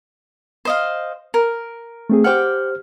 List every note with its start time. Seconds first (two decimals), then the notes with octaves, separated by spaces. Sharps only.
0.65 C5 D#5 F5
1.34 A#4
2.10 A3 C4 G#4
2.24 G4 C5 F#5 G5 D6 F6